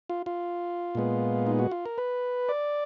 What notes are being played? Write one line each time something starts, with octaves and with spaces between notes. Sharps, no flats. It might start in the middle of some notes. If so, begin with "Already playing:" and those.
F4
F4
A#2 G#3 B3
D#4
F#4
F4
A#4
B4
D5